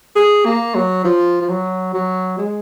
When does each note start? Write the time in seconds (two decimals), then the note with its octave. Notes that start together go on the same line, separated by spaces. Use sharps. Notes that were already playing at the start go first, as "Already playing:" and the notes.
0.16 G#4
0.45 A#3
0.75 F#3
1.05 F3
1.41 F3
1.49 F#3
1.94 F#3
2.38 G#3